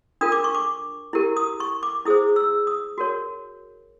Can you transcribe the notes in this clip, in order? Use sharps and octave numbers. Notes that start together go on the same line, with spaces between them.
D4 F4 A#4 D#6
D6
C#6
D6
E4 G4 A#4
D#6
C#6
D6
E4 G#4 C5 D#6
E6
D#6
F#4 A#4 C#5